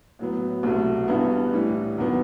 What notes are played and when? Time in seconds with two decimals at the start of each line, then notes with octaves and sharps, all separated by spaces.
0.19 A2 F#3 B3
0.63 C2 B2 F#3 A3
1.08 G2 E3 G3 B3
1.53 A2 E3 G3
1.98 E2 D#3 F#3 B3